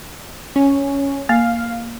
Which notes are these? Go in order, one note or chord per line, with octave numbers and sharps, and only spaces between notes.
C#4
A#3 F5